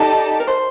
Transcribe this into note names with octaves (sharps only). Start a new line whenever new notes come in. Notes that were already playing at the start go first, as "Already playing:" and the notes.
Already playing: D#4 G4 A4 D5 A5
A#4
C5